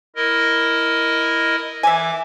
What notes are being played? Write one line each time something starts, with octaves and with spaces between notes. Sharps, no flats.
E4 A#4 D#5
E3 E5 G#5 D6